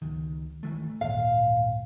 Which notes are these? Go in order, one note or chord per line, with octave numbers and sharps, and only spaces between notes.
C#2 D#3
D#3 E3 A3
D1 G#1 A#2 F5